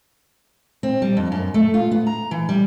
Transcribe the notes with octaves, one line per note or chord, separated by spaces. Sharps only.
C4
G3
F2
F#2
A3
F4
B3
A#5
E3
G3